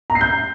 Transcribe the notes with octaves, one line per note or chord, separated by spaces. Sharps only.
A#5
C7
G6